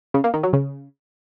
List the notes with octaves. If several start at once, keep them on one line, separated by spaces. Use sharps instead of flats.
C#3
A#3
D#3
F#3
C#3